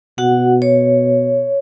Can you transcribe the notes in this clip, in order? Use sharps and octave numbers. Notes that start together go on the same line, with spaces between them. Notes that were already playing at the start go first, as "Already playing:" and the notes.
B2 F#4 F#5
C#5